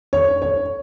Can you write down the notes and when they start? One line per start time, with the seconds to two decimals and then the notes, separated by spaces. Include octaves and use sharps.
0.13 C#5
0.42 C#5